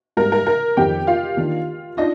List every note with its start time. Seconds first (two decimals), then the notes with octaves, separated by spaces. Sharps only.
0.17 G#2 G3 A#3 A#4
0.32 A#4
0.47 A#4
0.77 F2 D#3 A#3 G4 G5
1.07 F4 F5
1.37 D#3 A#3 D4
1.97 D4 D#4 F4 D#5